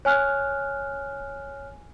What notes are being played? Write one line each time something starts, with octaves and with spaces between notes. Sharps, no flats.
C#5 G#5 F6 F#6